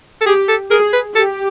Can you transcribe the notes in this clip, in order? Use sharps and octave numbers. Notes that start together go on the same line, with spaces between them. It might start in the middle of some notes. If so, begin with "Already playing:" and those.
A4
G4 G#4
A4
G#4 A#4
B4
G4 A4